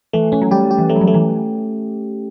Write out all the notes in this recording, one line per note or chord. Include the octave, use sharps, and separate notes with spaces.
E3 A3
E3 C#4
F#3
G3 G4
G4
E3
F#3 A3
G3
F#3
A3
E3